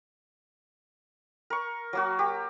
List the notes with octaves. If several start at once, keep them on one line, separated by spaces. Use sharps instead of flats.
A#4 C#6
F#3 A#3 F#4
G4